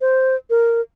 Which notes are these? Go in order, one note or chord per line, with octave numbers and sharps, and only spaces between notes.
C5
A#4